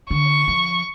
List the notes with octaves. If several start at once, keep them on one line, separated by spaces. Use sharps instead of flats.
D3 C#6
F3